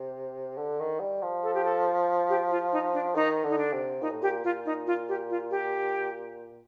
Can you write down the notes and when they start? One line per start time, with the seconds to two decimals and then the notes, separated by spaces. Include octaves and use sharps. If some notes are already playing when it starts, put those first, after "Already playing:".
Already playing: C3
0.57 D3
0.79 D#3
1.00 G3
1.22 F3
1.43 A4
1.54 G4
1.65 A4
2.29 G4
2.51 F4
2.72 D#4
2.93 D4
3.15 D#3 D#4
3.44 D3
3.50 D#4
3.58 D4
3.73 C3
4.01 A#2 D#4
4.10 A2
4.21 A#2 G4
4.44 A#2 F4
4.65 D#4
4.87 F4
5.08 G4
5.30 F4
5.50 G4